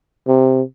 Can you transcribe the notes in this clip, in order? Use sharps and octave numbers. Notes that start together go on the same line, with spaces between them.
C3